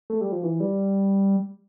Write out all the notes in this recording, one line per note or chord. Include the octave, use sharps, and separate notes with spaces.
A3
G3
F3
E3
G3